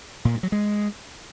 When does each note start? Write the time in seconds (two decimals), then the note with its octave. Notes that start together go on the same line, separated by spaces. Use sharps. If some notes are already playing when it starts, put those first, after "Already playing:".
0.25 A#2
0.34 G2
0.43 F#3
0.52 G#3